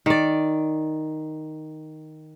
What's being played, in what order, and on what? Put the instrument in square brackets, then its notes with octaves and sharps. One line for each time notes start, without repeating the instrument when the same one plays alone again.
[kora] D#3 D5